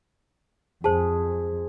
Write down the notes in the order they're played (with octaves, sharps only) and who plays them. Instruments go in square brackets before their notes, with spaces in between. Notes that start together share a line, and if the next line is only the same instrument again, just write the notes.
[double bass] F2 [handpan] G#4 [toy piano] C5 A5